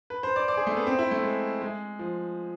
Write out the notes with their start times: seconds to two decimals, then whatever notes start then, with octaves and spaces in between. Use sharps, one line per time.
0.10 B4
0.23 C5
0.36 D5
0.48 D5
0.57 G#4
0.67 A3
0.77 B3
0.87 C4
0.99 E4
1.11 A3
1.23 G#3
1.61 G#3
1.99 F3